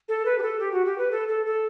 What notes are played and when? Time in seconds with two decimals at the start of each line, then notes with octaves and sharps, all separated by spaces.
0.08 A4
0.25 B4
0.38 G4
0.42 A4
0.59 G4
0.72 F#4
0.85 G4
0.98 B4
1.11 A4
1.28 A4
1.46 A4